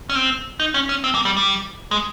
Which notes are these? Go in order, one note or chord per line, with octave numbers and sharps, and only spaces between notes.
C#4
C4
D#4
C#4
C#4
C4
A#3
G3
G3
G#3